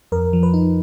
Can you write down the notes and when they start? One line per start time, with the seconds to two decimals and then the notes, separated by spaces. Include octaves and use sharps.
0.12 F2 A#4
0.33 F3
0.43 B4
0.54 D#4